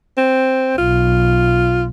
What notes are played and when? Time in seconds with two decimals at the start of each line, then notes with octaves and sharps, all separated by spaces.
0.18 C4
0.78 B1 F4